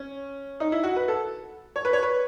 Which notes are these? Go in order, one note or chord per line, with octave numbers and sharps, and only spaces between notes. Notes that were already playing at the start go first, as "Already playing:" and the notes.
Already playing: C#4
D#4
E4
F#4
B4
A4
C#5
B4
C#5
B4